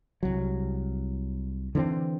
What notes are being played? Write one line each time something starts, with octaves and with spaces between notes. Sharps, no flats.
C2 F#3
D3 E3 A#3 C4